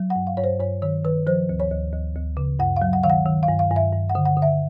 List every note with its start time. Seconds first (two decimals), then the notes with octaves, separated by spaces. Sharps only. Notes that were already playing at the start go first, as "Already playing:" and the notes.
Already playing: F#3
0.10 F#5
0.16 G2
0.27 F5
0.37 G2 C#5
0.44 C5
0.60 G2 C#5
0.82 D#3 C#5
1.05 D#3 B4
1.27 F3 C5
1.49 D2
1.60 C#5
1.71 D2
1.93 D2
2.16 D2
2.37 C#3
2.59 G2 F#5
2.76 F5
2.82 F#3
2.93 F#5
3.03 D#3 F5
3.10 F#5
3.26 D#3
3.43 F5
3.48 G2
3.59 F5
3.70 G2
3.76 E5
3.93 G2
4.10 F#5
4.15 D3
4.26 F#5
4.37 D3
4.42 E5